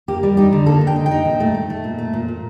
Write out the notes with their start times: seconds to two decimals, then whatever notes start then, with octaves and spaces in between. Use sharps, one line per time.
0.08 A#3 G4
0.23 G3
0.37 D#4 G4
0.53 D3
0.66 A#3 A4
0.81 D3
0.87 G5
0.96 D#4
1.06 G5
1.11 D#4
1.25 A#2
1.40 A3
1.55 A3
1.70 A3
1.84 A#2
1.98 A3
2.13 A#2
2.28 A#2